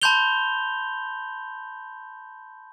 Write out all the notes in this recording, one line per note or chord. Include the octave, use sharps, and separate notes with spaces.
A5 B5 C6 G6 F7 G7